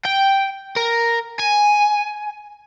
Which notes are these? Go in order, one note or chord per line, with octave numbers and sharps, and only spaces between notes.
G5
A#4
G#5